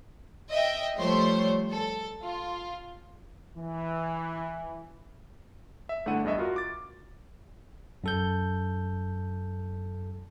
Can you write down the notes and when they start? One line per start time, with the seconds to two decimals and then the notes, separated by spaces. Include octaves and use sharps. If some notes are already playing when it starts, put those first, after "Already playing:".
0.49 D#5 E5 G5
0.96 F3 G3 A3 C5 C#5 C6
1.69 A4
2.24 F4
3.57 E3
5.89 E5
6.06 G1 A3 D4 E4 F#5 D#7
6.24 E2 G2 D#5 E5
6.38 F4 F#4 A#4
6.56 D6 A6
8.04 F#2 A4 G6